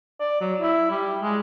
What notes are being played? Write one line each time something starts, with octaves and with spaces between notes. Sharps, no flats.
D5
F#3
E4
G3
G#3